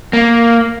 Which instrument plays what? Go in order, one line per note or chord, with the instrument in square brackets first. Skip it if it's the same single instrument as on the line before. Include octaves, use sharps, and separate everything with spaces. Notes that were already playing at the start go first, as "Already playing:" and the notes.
[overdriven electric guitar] A#3